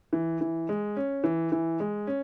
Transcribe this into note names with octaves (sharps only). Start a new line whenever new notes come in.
E3
E3
G#3
C#4
E3
E3
G#3
C#4